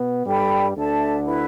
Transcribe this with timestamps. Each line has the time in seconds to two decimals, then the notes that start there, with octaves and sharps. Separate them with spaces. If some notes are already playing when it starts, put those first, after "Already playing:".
Already playing: B2 B3
0.25 G2 G3 A4 G5 B5
0.75 D2 D3 A4 E5 A5
1.26 E4 B4 E5 B5